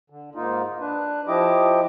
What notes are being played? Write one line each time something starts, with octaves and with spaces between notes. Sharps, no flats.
D3
G#2 A#3 D#4 F4
D4 B4
F3 E4 G4 D#5 D6